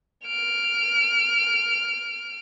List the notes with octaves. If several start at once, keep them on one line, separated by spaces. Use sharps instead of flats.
F6 D7